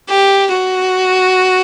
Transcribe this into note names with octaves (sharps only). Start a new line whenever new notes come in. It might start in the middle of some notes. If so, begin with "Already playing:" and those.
G4
F#4